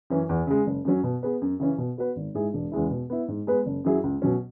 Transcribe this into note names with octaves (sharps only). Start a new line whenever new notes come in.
F#2 E3 C#4
E2
C#3 G#3
F#1
F#2 F#3 C#4
B2
B3 G#4 B4
F#2
C#3 E3 C#4
B2
B3 F#4 B4
G#1
G#2 G#3 E4 G#4
E1
E2 C#3 G#3 E4
B2
B3 E4
G#2
G#3 B3 G#4 B4
F#1
F#2 F#3 E4 G#4
C#2
B2 F#3 C#4